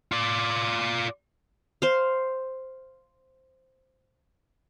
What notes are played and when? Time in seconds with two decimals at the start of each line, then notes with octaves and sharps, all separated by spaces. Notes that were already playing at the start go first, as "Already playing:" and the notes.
0.12 F4 D5
1.82 C5 F5